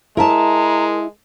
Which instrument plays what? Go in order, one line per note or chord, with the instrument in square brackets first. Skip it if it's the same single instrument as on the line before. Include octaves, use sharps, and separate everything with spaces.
[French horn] G#3 [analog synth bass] E4 [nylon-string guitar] A#4 E5 A5 [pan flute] A#5